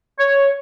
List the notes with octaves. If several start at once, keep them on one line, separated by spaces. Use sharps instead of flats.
C#5